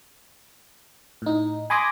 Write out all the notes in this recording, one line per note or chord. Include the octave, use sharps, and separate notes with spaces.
A2 D#4
G#5 B5 C6 D6 D#6 A#6